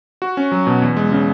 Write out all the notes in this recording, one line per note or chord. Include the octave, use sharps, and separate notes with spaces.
F#4
C#4
F#3
B2
E2
G#3
C#3